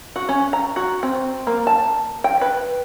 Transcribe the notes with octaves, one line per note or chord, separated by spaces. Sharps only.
F#4
C#4
A#5
F#4
C4
A#3
A5
G5
B4